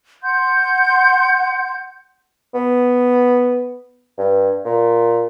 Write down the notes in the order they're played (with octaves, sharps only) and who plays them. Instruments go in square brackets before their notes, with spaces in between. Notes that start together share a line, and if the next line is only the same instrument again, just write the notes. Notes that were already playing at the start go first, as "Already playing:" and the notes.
[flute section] F#5 C6 G6
[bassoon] B3
G2
A#2